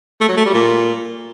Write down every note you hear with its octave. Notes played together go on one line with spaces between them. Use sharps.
A3
F#3
A3
G3
A#2